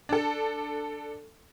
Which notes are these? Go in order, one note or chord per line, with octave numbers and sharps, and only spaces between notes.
D4 A4